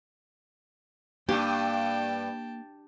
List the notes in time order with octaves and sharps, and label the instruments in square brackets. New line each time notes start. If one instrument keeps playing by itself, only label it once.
[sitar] G2 [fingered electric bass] A#3 [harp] G4 [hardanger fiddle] G5 A5